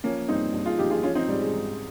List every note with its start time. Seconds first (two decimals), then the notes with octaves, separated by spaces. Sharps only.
0.04 F3 A#3 C#4
0.28 G2 C4 D#4
0.53 G2
0.66 F4 G#4
0.78 F3 D#4 G4
0.90 F4 G#4
1.03 F3 C#4 F4
1.15 C4 D#4
1.28 G#2 G3
1.41 G#3
1.53 G#2